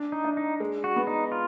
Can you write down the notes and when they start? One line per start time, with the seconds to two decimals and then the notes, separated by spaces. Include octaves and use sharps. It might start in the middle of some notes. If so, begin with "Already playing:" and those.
Already playing: D4
0.12 D#4
0.24 D4
0.37 D#4
0.60 G#3
0.84 F#4
0.96 B3
1.07 D#4
1.32 F4